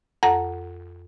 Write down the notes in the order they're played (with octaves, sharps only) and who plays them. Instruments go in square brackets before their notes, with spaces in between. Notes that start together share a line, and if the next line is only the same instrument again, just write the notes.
[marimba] F2 A4 F#5 A#5 A#6